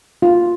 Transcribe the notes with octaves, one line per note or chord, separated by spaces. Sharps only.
F4